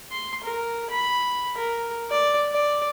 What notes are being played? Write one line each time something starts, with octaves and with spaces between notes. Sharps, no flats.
C6
A#4
B5
A#4
D5
D5